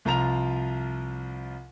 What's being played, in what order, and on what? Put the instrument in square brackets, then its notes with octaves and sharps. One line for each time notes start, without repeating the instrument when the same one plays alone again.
[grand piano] C2 F3 F4 A#5 F7